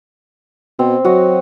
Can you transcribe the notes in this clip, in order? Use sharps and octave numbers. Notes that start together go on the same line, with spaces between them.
B2 C4
F#3 F#4 D#5